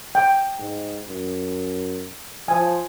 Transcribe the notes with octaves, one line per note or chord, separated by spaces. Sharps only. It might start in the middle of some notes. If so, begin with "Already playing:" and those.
G5
G#2
F#2
F3 G#5